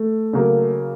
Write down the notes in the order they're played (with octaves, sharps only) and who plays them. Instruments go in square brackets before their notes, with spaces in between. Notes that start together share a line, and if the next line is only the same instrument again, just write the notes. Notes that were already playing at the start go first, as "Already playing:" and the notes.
Already playing: [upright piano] A3
[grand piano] C#3 F#3 A#3